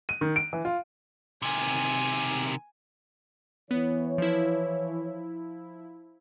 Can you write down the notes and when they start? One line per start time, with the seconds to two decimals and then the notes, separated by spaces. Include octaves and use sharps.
0.09 D#7
0.21 D#3
0.36 D7
0.53 E3
0.65 F4
1.42 C3 D#3 G#5
3.71 E3 B3 C#5
4.18 F3 E4